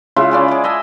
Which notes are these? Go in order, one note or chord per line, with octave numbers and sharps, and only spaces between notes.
C#3 G#3 E4 F4
C#4 D5 G#5
G#4 D5
D#5 E5 G#5 A5